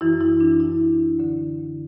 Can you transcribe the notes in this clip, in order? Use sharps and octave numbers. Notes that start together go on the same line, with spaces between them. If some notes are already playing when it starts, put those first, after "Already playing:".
F#2 E3 E4
E4
D4
E4
D2 D3